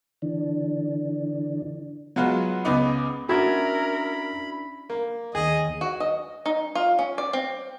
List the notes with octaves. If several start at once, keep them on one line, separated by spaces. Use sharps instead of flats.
D3 E3 D4
F#3 G#3 B3 F4 F#4
C#2 C#3 B3 D#4 D6
C#4 D4 E4 F#4 A#4 B5 E6 G#6
A#3
D#2 G#4 D#5
F#4
D#5
D#4
F4
C#4
D5
C4